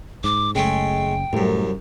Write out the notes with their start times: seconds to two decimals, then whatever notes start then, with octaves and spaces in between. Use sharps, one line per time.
0.24 G#2 D6
0.55 F#1 C#3 G#3 A3 G5
1.33 C2 F#2 A2 A3